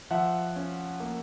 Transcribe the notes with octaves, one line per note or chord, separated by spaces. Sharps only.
F3 E5 F#5
C#4
A#3